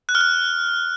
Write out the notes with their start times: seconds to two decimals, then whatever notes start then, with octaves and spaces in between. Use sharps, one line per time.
0.09 F#6
0.15 F6
0.21 F#6